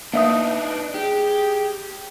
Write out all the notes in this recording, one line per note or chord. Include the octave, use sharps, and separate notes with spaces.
A#3 D4 D#4 B4 E5 D#6
G4 G#4